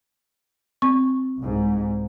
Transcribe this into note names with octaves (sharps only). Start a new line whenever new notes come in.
C4 C#6
C2 G#2